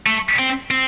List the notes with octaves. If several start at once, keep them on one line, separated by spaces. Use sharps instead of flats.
A3
C4
C4